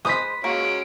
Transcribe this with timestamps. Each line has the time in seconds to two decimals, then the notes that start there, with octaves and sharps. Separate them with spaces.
0.05 G#3 B4 C5 D#6 B6
0.44 G#3 A#3 C#4 F#4 D7